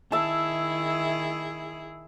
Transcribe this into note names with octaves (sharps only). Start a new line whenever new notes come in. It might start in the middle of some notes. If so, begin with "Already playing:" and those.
D#3 E4 G#4 E5 A5